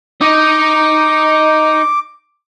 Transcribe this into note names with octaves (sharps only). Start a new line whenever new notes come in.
D#4 D#5 D6